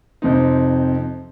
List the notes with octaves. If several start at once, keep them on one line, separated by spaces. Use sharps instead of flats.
F2 C3 C4 D#4